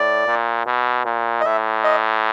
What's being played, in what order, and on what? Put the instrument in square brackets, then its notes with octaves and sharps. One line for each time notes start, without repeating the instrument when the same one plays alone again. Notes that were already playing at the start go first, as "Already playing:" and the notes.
Already playing: [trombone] A2 [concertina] D5
[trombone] A#2
B2
A#2
[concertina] D#5
[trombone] A2 [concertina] E5
[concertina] D#5